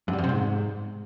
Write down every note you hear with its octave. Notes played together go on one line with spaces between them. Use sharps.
F#2
G3
F2
C3
G#2